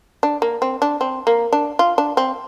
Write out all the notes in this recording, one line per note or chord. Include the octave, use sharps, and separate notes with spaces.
D4
A#3
C4
D4
C4
A#3
D4
F4
D4
C4